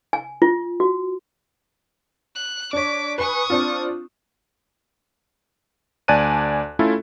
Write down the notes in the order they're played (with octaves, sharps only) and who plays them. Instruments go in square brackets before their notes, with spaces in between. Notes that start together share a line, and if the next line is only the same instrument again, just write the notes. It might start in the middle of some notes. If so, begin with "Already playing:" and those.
[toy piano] G#5
F4
F#4
[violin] F#6
[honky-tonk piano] D4 C#5 [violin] D6 B6
[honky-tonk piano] B4 G#5 [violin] C#6 D#6
[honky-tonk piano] C4 D4 F4
[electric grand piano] D2 D5 G#5 A5 F#6 D#7
A3 C#4 E4 F4 A4